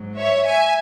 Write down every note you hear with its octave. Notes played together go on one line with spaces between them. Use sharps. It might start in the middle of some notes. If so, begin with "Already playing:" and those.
Already playing: G#2 F#3
C#5 E5
E5 G#5